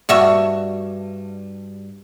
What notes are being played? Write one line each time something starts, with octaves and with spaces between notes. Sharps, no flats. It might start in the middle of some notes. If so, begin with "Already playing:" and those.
G2 F#4 E5